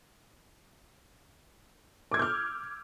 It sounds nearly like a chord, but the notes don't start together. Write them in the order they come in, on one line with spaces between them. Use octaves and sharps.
D6 G#6 E6 G6 F6